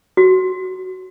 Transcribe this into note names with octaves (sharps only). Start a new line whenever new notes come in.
F#4